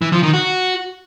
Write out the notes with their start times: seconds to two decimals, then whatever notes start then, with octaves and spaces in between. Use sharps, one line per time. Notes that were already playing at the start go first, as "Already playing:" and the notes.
0.02 E3
0.12 F3
0.23 D#3
0.34 F#4